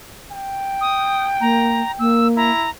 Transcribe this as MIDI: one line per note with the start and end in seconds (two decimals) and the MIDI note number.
0.31 2.14 79
0.81 1.27 87
1.41 1.81 58
1.41 1.92 82
1.99 2.51 58
1.99 2.28 88
2.37 2.68 64
2.37 2.70 82